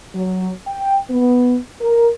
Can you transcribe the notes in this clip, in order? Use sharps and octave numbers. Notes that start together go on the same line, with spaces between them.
F#3
G5
B3
A#4